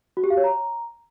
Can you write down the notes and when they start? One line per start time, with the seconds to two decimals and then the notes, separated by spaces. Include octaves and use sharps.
0.17 F#4
0.24 G4
0.30 F5
0.37 C#5
0.44 A#5